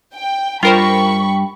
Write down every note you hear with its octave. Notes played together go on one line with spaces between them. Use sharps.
G5
G2 F4 A#4 C5 G5 B5 C#6